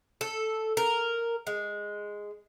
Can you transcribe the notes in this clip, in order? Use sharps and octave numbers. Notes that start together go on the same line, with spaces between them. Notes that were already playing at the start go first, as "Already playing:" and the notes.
A4
A#4
G#3